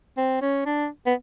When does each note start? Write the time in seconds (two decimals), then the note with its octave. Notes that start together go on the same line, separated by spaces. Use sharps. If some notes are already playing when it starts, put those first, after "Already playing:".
0.18 C4
0.42 C#4
0.66 D4
1.07 B3